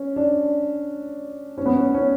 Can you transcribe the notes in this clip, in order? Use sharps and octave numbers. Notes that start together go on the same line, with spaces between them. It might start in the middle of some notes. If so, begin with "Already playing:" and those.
Already playing: C#4
D4
C#4
B3
C#4
C#4